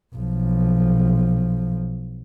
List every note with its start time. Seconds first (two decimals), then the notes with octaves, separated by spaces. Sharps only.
0.16 B1 F3